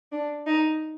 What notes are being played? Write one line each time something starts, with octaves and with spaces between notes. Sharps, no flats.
D4
D#4